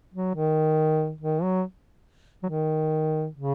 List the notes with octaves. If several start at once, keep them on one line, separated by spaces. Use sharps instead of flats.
F#3
D#3
D#3
F#3
F#3
D#3
C#3